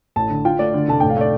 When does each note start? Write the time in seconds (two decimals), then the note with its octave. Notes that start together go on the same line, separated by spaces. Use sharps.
0.16 A1 A5
0.30 D3
0.45 F4 G5
0.59 A3 D5
0.74 D3
0.88 F1 A5
1.00 A2 G5
1.10 F5
1.17 A3 D5